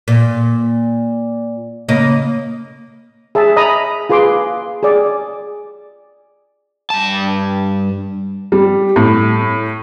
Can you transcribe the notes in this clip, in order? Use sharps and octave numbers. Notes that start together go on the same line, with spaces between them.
A#2
C#3 A#3 D#5
G#4 E5 A5
D#5 A#5 B5 D#6
F4 G#4 B4 C6 D6
G#4 D5
G2 A5
G3
A2